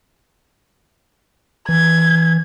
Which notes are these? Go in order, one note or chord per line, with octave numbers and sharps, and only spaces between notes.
E3 G#6